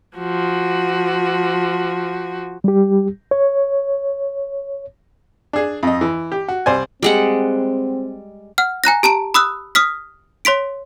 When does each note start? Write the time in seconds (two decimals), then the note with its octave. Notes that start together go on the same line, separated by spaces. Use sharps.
0.17 F3 F#4
2.64 G3 G4
3.31 C#5
5.53 D4 G#4
5.83 F2 D#5
6.01 E3
6.32 G4
6.48 F#4
6.66 C2 C5 D5 G#5
7.03 G3 G#3 C4 F#5
8.58 F#5 F6
8.84 G#5 A#5 F#6 A#6
9.03 G4 A5 A#5 D7
9.34 B5 D#6 E6 F#6
9.75 D#6 F6 B6
10.45 C#5 C6 B6 D7